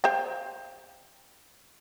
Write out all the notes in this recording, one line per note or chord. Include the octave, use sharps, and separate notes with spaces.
C5 F5 G5